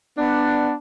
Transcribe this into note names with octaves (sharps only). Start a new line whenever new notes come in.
B3 D4